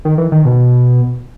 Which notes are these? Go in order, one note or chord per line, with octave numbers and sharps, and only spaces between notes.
D#3
E3
D#3
B2